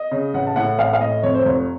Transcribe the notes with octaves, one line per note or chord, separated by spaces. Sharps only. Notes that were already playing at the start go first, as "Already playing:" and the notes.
Already playing: D#5
C#3
A1 F#5
A5
A2 F#5
A1 F5
F#5
F5
A2 D#5
F2 C#5
C5
F1 C#5